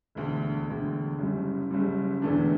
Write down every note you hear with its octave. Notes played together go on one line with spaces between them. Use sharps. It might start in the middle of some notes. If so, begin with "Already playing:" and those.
E1 D2 D3
E1 D2 D3
F#1 F#2 C#3 G3
F#1 F#2 C#3 G3
E1 E2 D3 A3 D4